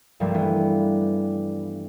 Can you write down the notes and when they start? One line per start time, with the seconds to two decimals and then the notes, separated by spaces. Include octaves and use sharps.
0.20 C2 G2 F3 G3 A3 A#3
0.34 E3 B3 D4